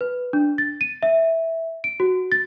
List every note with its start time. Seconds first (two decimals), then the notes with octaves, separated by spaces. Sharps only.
0.01 B4
0.33 D4
0.58 A6
0.81 D#7
1.03 E5
1.84 D7
2.00 F#4
2.32 A6